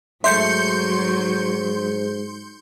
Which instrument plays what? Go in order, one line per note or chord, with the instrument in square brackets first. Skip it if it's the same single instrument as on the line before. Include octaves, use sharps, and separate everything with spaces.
[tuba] G#2 [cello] F#3 [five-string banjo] A3 E5 [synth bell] C6 G6 C#7